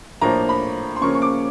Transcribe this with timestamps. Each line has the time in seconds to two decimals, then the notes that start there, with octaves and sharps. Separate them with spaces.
0.21 A2 F3 A#3 D4 A#5
0.49 B5
0.96 C6
1.01 C#3 F3 A#3 C#4 C#6
1.15 C#6
1.22 D6